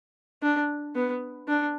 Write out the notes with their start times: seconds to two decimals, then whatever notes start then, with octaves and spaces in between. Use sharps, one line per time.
0.42 D4
0.95 B3
1.48 D4